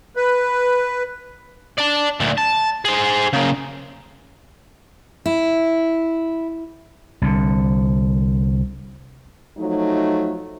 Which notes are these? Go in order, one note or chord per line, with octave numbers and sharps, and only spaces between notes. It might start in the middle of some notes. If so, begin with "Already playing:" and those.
B4
D5 A5
D2 A#2
A5
G#4 C5
C#3 A#3
E4
C2 D3
F3 F#3 A3 D#4